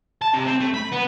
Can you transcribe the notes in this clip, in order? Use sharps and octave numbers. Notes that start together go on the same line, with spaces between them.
A5
C3
C4
A3
B5
B3